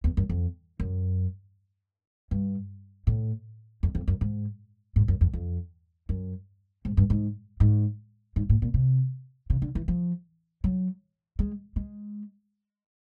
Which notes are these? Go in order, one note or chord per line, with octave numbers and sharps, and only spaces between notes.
E2
F#2
F2
F#2
G2
A2
F2
F2
F#2
G#2
G#2
F#2
F2
F2
F#2
G#2
G2
G#2
G#2
G#2
A2
A#2
C3
C#3
D3
E3
F3
F#3
G#3
G#3